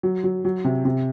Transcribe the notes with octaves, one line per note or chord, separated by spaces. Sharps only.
F#3
F#3
F#3
C3
C3